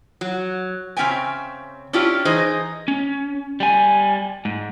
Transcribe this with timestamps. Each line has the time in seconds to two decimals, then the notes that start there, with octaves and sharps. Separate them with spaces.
0.21 F#3
0.97 C#3 C4 C#4 E5 G5 G#5
1.93 C#4 D4 E4 F4 G4
2.25 E3 D#4 G#4 C5 D#5
2.88 C#4
3.60 G3 G#5
4.45 G#2